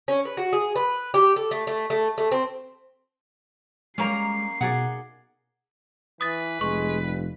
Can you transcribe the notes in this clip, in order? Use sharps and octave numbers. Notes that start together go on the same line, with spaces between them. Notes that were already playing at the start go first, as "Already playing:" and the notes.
C#4
B4
F#4
G#4
B4
G4
A4
A3
A3
A3
A3
C4
G3 G#3 A#3 C#4 A#5 C7
B2 D#4 G#4 D5 F#5
E3 B4 D#6 A6
F1 G#3 C#6
G2